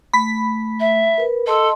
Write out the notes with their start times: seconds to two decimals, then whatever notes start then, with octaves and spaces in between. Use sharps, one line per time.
0.13 A3 B5 B6
0.80 E5
1.18 A#4 B4
1.47 A4 D#5 A5 C6